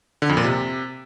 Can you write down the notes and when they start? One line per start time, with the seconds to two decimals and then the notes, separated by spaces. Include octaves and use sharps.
0.22 D3
0.29 F2
0.37 A#2
0.44 C3